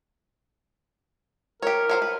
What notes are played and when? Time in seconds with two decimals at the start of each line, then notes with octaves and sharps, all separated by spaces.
1.62 G4 A#4 C#5
1.89 F#3 C5 C#5
2.02 B4